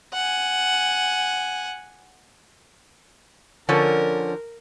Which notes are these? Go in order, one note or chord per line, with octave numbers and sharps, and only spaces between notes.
F#5 G#5
D3 F3 C#4 A#4